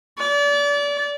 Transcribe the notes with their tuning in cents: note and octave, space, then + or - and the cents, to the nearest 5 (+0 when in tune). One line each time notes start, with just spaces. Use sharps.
D5 -30